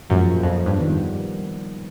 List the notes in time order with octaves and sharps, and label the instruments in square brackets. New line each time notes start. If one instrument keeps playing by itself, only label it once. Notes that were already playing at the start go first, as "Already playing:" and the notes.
[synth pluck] F#2 [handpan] A#2 F3 G#3
[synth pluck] F2
G2
[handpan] D#3 G3 B3